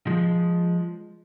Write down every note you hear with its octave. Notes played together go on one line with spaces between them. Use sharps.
F3 G#3